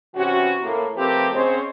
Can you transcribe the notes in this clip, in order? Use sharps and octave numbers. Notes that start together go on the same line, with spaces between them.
C3 E3 C#4 F#4
A2 A#3
F3 A3 C4 G4 A#4 B4
C#3 C4 C#4 C5 C#5 D#5